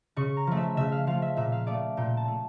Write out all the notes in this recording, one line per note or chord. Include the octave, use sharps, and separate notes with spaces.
C#3 C#6
A#5
F3 A3
E5
C#3 E5
F5
F3 A3 F5
E5
A#2 E5
F5
A3 D5
A#2 G5
A5
A3